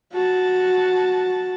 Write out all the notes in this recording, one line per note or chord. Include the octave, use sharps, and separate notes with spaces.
F#4 A5